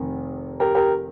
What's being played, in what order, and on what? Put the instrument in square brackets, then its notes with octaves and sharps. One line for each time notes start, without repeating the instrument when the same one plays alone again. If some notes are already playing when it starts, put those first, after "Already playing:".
Already playing: [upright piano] F1 C3 D#3
G4 A#4
G4 A#4